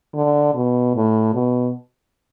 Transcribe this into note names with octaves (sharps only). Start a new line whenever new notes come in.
D3
B2
A2
B2